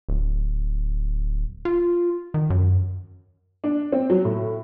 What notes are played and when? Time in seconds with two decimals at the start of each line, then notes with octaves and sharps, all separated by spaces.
0.09 D1
1.65 F4
2.34 D#3
2.50 F#2
3.64 D4
3.92 C4
4.10 F#3
4.25 A2